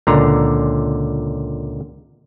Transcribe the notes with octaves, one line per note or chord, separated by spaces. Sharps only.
C#2 A#2 D3 A#5